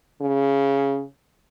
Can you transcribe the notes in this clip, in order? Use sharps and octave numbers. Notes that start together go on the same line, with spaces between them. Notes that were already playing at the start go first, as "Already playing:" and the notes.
C#3